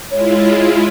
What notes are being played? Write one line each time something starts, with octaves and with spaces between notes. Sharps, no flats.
G#3 E4 F4 C#5